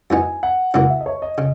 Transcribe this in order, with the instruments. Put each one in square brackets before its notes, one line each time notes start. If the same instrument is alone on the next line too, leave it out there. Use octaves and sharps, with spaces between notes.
[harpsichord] F#2 E3 B3 D#4 [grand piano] G#5
[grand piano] F#5
[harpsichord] F#2 C#3 E3 A#3 [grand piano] F#5
[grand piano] E5
D#5
C#5
D#5
[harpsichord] C#3